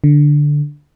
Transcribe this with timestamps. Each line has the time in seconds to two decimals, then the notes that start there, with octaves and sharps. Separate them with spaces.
0.04 D3